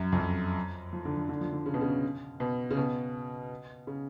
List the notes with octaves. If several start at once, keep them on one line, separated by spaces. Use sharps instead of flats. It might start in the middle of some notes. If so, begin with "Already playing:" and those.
Already playing: F#2
F2
F#2
F3
D3
F3
D3
F3
D3
C#3
B2
C#3
B2
C#3
B2
C#3